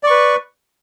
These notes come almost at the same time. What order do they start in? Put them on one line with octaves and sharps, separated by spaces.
D5 C#6 B4